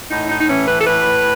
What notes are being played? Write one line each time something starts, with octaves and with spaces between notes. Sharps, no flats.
A2 D#4
D#4
D#4
E3 C#4
B4
A4
A2 B4